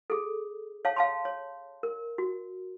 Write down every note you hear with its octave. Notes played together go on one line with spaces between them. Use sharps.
G#4 A4
C#5 F5 A5
F5 A5 C6
C#5
A#4
F#4